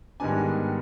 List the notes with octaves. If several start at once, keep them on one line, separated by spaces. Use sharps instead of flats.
G#2 D#3 G3 B3 D4 G#5